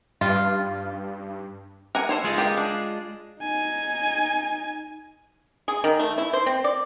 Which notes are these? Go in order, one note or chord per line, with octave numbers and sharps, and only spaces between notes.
G2 F4
A#4 F#5 G#5
A4 C5 C#5
G#3 F4 G#4
G4 A#4
D4
D#4 G#5
G#4
D#3
A3
E4
C5
C4
D5